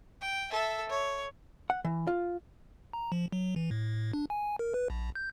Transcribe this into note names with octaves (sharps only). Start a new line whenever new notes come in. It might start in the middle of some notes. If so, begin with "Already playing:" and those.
G5
A4 E5
C#5
F#5
E3
F4
A#5
F3
F#3
E3
A2
D4
G#5
A#4
B4
A#1
G6